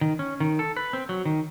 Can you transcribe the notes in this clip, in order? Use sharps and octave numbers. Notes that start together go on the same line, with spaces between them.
D#3
C#4
D#3
A4
B4
C4
F#3
D#3